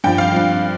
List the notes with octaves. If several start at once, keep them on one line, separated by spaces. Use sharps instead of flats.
G2 F3 G5
F5
G2 F3